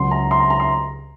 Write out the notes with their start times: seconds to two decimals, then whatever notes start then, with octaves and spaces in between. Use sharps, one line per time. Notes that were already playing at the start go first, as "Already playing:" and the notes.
Already playing: C#2 C#3 F#3 C6
0.11 A#5
0.31 C6
0.40 A#5
0.50 A#5
0.60 C6